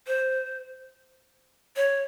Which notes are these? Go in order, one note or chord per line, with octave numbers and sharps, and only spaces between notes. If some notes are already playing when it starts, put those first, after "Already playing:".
C5
C#5